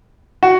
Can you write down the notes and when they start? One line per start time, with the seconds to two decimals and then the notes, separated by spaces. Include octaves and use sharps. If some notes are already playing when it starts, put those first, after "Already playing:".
0.43 F#4